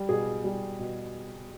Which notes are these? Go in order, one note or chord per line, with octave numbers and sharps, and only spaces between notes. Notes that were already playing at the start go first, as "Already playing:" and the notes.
Already playing: G3
B2 G#4
G3
B2